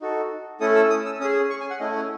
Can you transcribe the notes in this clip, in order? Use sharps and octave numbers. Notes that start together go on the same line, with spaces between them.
D#4 F#4 A4
A3 C#4 E4 A4 D#6
E6
D#6
E6
C#4 G#4 D#6
C#6
G#5
F#5
A3 C#4 E4 D#5
C#5